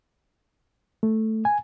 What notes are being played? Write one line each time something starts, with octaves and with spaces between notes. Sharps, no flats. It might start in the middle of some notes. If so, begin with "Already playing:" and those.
A3
G#5